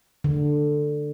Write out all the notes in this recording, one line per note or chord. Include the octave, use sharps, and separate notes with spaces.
D3